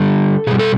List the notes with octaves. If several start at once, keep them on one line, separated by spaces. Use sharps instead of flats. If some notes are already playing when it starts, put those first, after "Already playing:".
Already playing: D3 G3 A4
B2 G3 G#4
A4